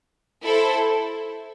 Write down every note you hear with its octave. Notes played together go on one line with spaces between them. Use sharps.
E4 A4 C5